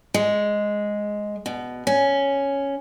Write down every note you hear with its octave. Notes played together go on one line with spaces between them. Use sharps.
G#3
B2
C#4